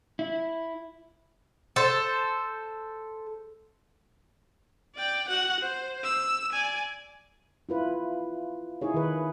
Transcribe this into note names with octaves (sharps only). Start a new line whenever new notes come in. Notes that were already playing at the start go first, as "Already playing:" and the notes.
E4
A4 C5
D5 G5
F#4 F#5
C5
E6
D5 G#5
E4 F4 B4
D#4 E4 G#4 C#5
D#3 B4